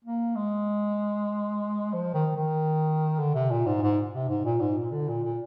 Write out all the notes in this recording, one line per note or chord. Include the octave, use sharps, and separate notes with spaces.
A#3
G#3
F3
D#3
D#3
D3
C3
A#2
G#2
G#2
C3
G#2
A#2
G#2
A#2
D3
A#2
A#2